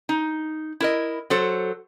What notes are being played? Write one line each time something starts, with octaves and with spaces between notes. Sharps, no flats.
D#4
E4 A#4 D#5
F#3 A4 C5